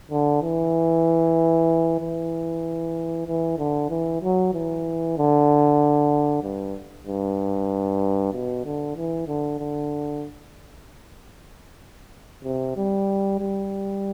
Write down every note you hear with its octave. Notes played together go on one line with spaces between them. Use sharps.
D3
E3
E3
E3
D3
E3
F#3
E3
D3
G2
G2
B2
D3
E3
D3
D3
C3
G3
G3